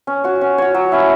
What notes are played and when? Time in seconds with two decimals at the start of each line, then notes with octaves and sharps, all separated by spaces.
0.07 C#4
0.24 F#4 C#5
0.41 C#4
0.58 F#4 C#5
0.74 F#3
0.92 C#4 E4